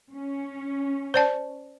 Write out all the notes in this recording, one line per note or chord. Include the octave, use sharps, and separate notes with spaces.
C#4
C5 D5 A5